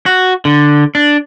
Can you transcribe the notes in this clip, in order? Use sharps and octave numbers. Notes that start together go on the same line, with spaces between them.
F#4
D3
D4